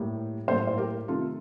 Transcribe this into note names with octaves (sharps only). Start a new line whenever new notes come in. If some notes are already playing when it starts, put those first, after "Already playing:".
Already playing: A2 G3 A#3
A2 G3 A#3 A4 C5
C5
G4 A#4
C3 D#3 A3 F4 A4